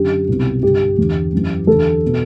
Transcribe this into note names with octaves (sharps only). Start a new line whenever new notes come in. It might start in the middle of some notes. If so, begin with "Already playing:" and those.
Already playing: F#2 D3 G4
C2 B2
G2 D3 G4
E2 D3
F#2 E3
E2 D3 A4
B2